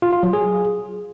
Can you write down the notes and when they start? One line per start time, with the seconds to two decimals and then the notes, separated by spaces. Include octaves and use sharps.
0.02 F4
0.13 F4
0.23 F#3
0.33 G#4